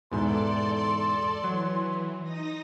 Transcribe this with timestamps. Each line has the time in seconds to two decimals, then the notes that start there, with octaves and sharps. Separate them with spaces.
0.12 E2 G#2 B2 A4 D5 C6
1.44 E3 F#3
2.23 D#4 D#6 A#6